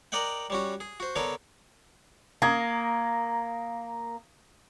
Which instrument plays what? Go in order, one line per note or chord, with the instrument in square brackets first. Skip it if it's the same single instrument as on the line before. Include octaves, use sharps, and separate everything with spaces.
[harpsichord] A#4 D5 D#5 F#5 G5
G3 C#4 F#4
G#4
F#4 C5
D3 B3 A4 A#4 C#5
[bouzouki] A#3 [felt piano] A#5 D#6 G#6